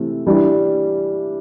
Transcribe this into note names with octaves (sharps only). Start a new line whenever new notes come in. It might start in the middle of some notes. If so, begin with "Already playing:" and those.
Already playing: C3 E3 A3
E3 G3 D4